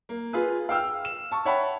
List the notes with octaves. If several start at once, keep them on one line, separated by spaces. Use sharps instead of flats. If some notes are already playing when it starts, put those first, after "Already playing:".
A#3
F4 G#4 B4
F5 G5 E6 F6
E7
A5 C#6
C#5 E5 F#5 G5 A5 B5